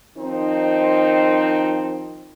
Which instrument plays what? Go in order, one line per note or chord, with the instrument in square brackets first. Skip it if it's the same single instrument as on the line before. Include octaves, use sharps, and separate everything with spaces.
[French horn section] D#3 F3 C4 D#4